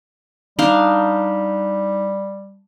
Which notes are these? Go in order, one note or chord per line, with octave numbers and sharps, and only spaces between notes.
G3 D4 D#4 F5